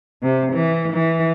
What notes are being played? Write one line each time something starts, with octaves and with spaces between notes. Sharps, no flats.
C3
E3
E3